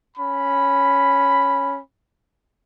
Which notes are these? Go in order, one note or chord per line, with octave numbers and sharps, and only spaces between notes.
C#4 B5